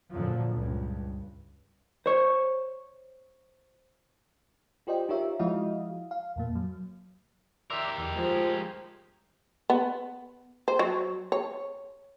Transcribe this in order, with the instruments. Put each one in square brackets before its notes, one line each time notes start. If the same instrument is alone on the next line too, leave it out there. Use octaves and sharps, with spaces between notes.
[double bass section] F#2 A#2 D3 F3 F#3
C#2 G2
[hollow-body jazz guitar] C5 C#5
[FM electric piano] F4 G4 C5 D5 D#5 G5
D#4 F4 G4 A#4 C#5 E5
F3 G#3 E4 F#4 D#5 F5
F5
F2 A#2 A#3
F#3
[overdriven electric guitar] G4 A#4 [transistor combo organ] D5 E5 C6
[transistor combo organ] E2
[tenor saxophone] F3 [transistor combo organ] G#3
[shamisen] B3
C5
F#3
C#5